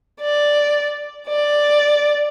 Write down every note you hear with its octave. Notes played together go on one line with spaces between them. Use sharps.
D5
D5